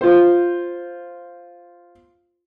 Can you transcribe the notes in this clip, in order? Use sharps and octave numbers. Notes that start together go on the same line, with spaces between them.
F4 C5